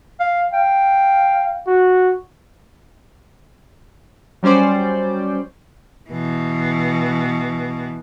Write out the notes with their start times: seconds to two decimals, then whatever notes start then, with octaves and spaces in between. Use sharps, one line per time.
0.20 F5
0.53 F5 G5
1.67 F#4
4.43 F#3 G3 C#4 C5 D5
6.10 B2 E3